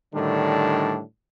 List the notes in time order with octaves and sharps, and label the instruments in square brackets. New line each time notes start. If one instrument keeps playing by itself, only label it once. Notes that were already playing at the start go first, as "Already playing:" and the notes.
[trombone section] A2 D3 D#3 G3 D4